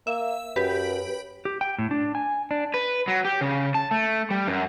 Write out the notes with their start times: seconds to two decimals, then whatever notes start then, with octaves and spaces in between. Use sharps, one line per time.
0.07 A#3 E5
0.56 F#2 G4 B4
1.45 G4
1.61 G5
1.79 A2
1.91 D4
2.15 G#5
2.51 D4
2.74 B4
3.08 F#3
3.25 G4
3.41 C#3
3.75 A5
3.91 A3
4.31 G3
4.48 F#2